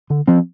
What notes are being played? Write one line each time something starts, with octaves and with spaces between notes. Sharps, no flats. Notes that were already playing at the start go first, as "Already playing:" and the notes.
D3
F3 C4